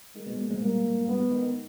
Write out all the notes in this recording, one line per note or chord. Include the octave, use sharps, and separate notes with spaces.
D#3 G#3
B2
G#2
A#2
G#2
G2 A#3
G#2
G2 B3
G#2
D#3
D#3